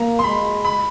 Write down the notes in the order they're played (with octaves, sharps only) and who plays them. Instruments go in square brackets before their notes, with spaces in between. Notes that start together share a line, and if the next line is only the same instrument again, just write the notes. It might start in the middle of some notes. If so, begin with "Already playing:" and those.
Already playing: [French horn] A#3 [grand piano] A#5
[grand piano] C6
[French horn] G#3 [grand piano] B5
[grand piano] B5